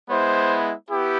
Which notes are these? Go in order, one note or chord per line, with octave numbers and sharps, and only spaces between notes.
G#3 B3 E4 C5
B3 E4 G4